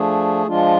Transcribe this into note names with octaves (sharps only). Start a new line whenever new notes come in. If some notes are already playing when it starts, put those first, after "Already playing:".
Already playing: F3 A3 D4 G#4
F3 G#3 D4 F4